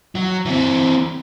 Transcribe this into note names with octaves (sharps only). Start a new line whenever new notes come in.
F#3
E3 C4